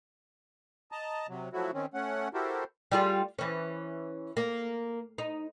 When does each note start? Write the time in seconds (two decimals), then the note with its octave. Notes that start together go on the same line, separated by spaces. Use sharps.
0.92 D#5 A5 A#5
1.29 C3 F#3
1.53 F3 F#3 A3 E4 F#4
1.73 D#3 C4 C#4
1.94 A3 C#4 F#5
2.34 E4 F#4 G4 A4 A#4 C5
2.92 G3 F4 G#4
3.39 E3 C#4
4.37 A#3
5.18 D#4